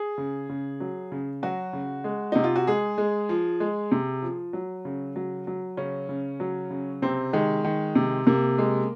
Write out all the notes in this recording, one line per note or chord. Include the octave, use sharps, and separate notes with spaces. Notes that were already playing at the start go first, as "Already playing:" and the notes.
Already playing: G#4
C#3
C#3
F#3
C#3
F#3 F#4
C#3
G#3
C3 D#4
F4
F#4
G#3 G#4
G#3
F3
G#3
C3
F3
F#3
C#3
F#3
F#3
C#3 C#4
C#3
F#3
C#3
C3 C4
D#3 G#3
D#3
C3
C3 A#3
G#3